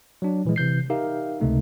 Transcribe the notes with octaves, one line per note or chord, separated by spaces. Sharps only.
F#3 D4
A#2 E3 F3 G#3
C3 E3 G6 C7
D#4 G4 A#4 E5 F5
C#2 C3 A3 D#4